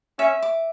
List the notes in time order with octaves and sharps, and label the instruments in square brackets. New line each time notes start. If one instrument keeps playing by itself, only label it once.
[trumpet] C#4 [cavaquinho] E5
[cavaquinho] D6